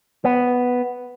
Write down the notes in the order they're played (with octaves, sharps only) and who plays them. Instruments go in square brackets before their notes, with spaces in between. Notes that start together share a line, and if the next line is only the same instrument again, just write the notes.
[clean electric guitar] B3